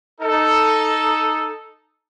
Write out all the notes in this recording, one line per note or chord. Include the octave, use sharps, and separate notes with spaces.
D#4 A4